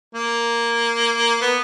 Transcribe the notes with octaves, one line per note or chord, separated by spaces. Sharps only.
A#3
B3